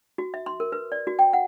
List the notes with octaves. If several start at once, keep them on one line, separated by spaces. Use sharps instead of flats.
F#4
E5
C6
A#4
B4
D5
F#4
G5
F#5